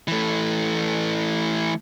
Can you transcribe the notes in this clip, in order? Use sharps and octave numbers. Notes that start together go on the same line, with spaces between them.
E3 A3